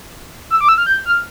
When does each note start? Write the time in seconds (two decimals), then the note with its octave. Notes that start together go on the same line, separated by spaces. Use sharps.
0.50 E6
0.61 D6
0.69 E6
0.78 F6
0.86 G6
1.06 F6